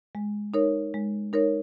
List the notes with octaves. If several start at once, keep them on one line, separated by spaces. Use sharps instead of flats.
G#3
D#4 A#4 C#5
G#3
D#4 A#4 C#5